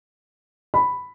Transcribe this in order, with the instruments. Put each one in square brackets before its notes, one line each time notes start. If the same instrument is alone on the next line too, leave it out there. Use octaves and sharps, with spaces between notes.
[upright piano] B5